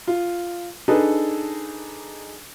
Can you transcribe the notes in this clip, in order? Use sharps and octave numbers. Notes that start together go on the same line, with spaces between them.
F4
D4 D#4 G#4 A4 B4